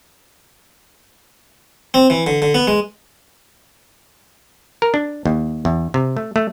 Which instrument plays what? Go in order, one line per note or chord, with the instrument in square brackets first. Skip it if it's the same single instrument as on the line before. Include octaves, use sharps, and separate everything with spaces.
[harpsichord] C4
E3
D3
D3
B3
G#3
[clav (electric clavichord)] A#4
D4
D#2
E2
C3
A3
A3